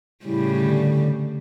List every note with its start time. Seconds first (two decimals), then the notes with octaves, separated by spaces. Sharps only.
0.25 A2 C#3 G3 E4
0.61 D3